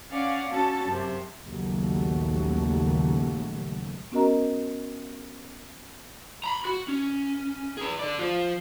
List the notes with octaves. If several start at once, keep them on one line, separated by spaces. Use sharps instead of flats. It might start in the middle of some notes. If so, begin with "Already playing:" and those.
C#4 D5 F5 F#5
C#4 F#4 A4 A5
F#2 C3
A#1 D#2 C#3 F#3 A3
B3 C#4 F#4 A#4 D#5 A#5
A#5 B5
F#4
C#4
G#4 B4
A4 D5
F3 F4